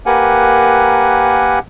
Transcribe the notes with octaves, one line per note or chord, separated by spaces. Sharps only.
A#3 G4 A#4 B4 F#5 G#5